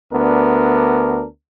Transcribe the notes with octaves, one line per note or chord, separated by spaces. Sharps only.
D2 B3 D4 A#4